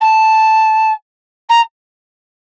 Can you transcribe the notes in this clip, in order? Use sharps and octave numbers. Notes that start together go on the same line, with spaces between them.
A5
A#5